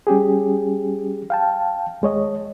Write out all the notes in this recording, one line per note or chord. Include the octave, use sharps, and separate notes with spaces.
G3 C#4 G4 G#4
F5 G5 A5
D#2 G#3 C#5 D#5